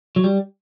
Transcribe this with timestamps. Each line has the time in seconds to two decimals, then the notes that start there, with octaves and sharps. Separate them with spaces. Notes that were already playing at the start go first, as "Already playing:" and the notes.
0.16 F#3
0.24 G3